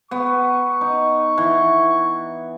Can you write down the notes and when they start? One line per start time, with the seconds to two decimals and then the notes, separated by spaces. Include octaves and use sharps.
0.11 B3 C#6
0.81 D#4
1.38 E3